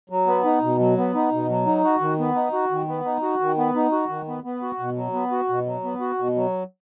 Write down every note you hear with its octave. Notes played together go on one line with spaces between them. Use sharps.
F#3
B3
D#4
B2
F#3
B3
D#4
B2
F#3
D#4
F#4
D#3
B3
D#4
F#4
D#3
B3
D#4
F#4
D#3
B3
D#4
F#4
D#3
B3
B3
F#4
B2
F#3
B3
F#4
B2
F#3
B3
F#4
B2
F#3